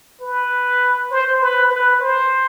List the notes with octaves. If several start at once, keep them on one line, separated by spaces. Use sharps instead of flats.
B4
C5
B4
B4
C5